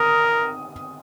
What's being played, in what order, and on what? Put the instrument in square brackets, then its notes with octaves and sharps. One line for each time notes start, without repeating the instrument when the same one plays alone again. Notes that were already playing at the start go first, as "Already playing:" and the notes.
Already playing: [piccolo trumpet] A#4 [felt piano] D#6